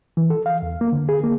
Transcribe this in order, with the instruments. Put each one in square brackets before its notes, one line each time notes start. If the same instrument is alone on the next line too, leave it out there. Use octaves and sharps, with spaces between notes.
[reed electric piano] E3
A4
F5
E2
A#3
D3
G#4
A#3